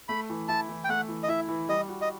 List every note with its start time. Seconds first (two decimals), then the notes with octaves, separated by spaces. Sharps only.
0.08 A3 B5
0.30 E3
0.48 E4 A5
0.69 E3
0.84 G5
0.89 A3 F#5
1.09 E3
1.23 D#5
1.28 E4 E5
1.48 E3
1.69 G3 D#5
1.89 F#4
2.02 D#5